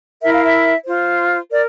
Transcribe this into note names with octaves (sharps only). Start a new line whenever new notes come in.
E4 A#4 E5
F5
E5
F4 C5
A#4 D5